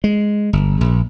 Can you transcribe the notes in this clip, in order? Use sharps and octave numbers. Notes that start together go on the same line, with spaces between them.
G#3
G1
A#1